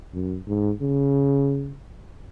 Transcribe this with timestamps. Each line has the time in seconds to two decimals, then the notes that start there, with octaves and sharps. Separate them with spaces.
0.14 F#2
0.47 G#2
0.81 C#3